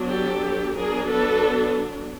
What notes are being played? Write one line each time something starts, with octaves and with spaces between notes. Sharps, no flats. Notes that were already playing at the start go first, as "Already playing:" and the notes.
Already playing: F#3 B3 D4
G4 A4
F#3 B3 D4 G#4 A#4
A4 B4